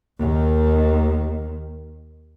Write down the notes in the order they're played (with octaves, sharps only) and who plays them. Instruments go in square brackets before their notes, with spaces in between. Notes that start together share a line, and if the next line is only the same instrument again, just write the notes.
[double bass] D#2 D#3